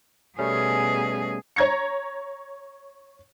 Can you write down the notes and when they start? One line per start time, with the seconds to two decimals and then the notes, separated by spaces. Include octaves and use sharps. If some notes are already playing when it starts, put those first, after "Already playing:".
0.39 B2 G3 A3 C#4 G#4
1.56 C#5 A#5 G#6 A#6 C#7